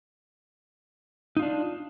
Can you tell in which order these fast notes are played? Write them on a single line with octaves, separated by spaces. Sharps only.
D#4 F4 D4